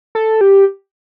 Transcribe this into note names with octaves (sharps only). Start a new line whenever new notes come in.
A4
G4